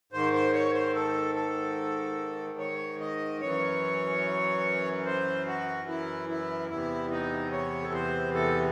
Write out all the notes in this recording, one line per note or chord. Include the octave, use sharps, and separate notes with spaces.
G#2 D#3 C5
C5
C#5
C5
A4
A4
C#5
D#5
F#2 E3 C#5
C5
F#4
E4
E4
E2 C3 E3 E4
D#4
C#5
A4
C5
A4